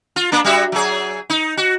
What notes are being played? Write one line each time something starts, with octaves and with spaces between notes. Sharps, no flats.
F4
A#3 D4
G3 F#4 E5
F#3 G#4
D#4
F#4